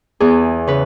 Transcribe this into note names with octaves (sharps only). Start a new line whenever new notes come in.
E2 G#4
C#3 B4